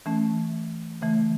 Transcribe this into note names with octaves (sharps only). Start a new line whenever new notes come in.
E3 A3 C#4
C#3 E3 A3